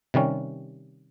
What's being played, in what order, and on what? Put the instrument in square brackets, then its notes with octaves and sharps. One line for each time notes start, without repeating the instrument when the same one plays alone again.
[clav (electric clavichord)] C3 D#3 G3 C#4